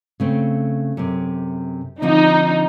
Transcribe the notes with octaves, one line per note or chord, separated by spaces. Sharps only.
C#3 A3 C4
F#2 C3
D3 F3 C4 D#4